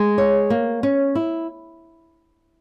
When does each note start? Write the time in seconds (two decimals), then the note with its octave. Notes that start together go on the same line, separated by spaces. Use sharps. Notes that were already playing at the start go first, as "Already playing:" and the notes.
Already playing: G#3
0.18 C#5
0.50 A#3
0.83 C#4
1.15 E4